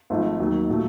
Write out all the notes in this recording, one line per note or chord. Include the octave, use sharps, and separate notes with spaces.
G#1 G#2 F3 A3
D#2 D#3 F#3
A#2 F#3 A3